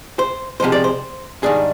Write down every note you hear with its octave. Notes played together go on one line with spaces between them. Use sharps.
C5
C3 F3 G#3 C5
D5
C5
G#2 D#3 G3 D4 G#4